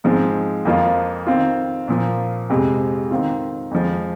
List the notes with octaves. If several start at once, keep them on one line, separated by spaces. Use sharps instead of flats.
G#2 F3 G#3 C4
F2 F3 A#3 F4
D#3 C4 F4
A#2 F3 A#3
F2 C3 G#3
D#3 C4 F4
F2 F3 G#3